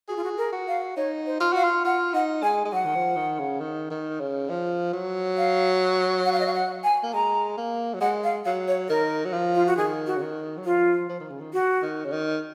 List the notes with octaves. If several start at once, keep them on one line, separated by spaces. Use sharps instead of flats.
F#4 G#4
F4
F#4
A#4
F#4
F5
D#4 C#5
C5
F4
F#4 F5
F4
F4 F#5
D#4 F#5
G#3 G#5
G#3
F#3 F#5
D#3
F3
D#3
C#3
D#3
D#3
C#3
F3
F#3
F5
F#5
F5
D#5
F5
F#5
G#5
A#3
G#3 A#5
A#3
F#3
G#3 F#5
F5
F#3 F5
C#5
D#3 A#4
F#3
F3
F4
F#4
D#3 G#4
F#4
C#3
D#3
F#3
F3 F4
F3
D#3
C#3
D#3
F#4
D#3
C#3
D#3